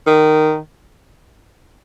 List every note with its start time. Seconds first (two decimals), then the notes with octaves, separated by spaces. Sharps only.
0.07 D#3